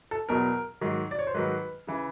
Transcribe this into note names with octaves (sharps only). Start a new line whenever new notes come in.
A4
E2 B2 F#3 A#4
G#2 D#3 F#3
D5
C#5
C5
G#2 D#3 F#3 B4
C#3 E3